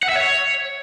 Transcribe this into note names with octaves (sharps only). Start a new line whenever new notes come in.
F#5
E5
C#5